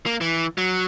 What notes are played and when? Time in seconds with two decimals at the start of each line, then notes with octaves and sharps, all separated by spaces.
0.06 A#3
0.21 E3
0.58 F#3